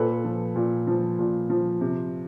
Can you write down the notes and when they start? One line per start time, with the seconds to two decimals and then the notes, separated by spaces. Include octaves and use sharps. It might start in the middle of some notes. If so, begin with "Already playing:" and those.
Already playing: A#2 A4 B4
0.24 F3
0.55 A#2
0.87 F3
1.19 A#2
1.50 F3
1.81 C3